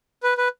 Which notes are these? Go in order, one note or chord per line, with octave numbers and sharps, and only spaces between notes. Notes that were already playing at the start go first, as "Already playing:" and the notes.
B4
B4